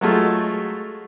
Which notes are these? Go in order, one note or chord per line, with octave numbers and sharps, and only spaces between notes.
F#3 G#3 A3 F4